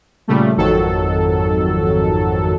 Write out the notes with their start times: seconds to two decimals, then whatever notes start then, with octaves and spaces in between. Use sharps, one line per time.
0.28 A#2 C#3 G3 A3
0.57 G#1 F2 D#3 F#3 A4